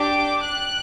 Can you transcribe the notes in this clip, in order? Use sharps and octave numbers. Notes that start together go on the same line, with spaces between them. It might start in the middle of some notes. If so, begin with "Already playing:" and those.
Already playing: D4 G4 D6
F#6